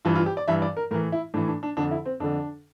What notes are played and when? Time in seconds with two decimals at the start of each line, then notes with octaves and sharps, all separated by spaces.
0.05 G2 E3 F4
0.16 F4
0.26 G4
0.37 D5
0.48 G2 E3 E5
0.62 D5
0.77 A#4
0.91 A2 A#4
0.94 E3
1.12 E4
1.34 A2 E3 D4
1.48 D4
1.63 D4
1.77 F2 D3 D4
1.91 E4
2.05 C4
2.20 F2 D3 D4